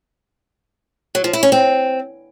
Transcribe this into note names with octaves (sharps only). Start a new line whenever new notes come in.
F#3
F3
E4
C#4
C4